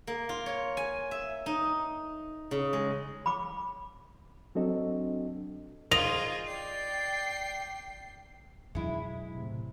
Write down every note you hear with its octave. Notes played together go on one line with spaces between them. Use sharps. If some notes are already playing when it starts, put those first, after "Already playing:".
A#3
F4
C#5
G#5
E5
D#4
C#3
G#3
B5 D6
F#3 C4 D4 F#4 A4 D#5
D#4 F4 G#4 D#5 F7
D5 G5 C7
B1 F2 E3 F#3 G#3 E4
A2 C3